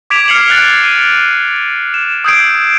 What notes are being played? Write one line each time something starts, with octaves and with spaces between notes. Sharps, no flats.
D6 G#6 B6 D7 E7 F7
F6 G#6 C7 C#7 F7 F#7
F#6 A6 D7
C#7 D#7
E7
D#6 E6 G6 G#6 C7 D7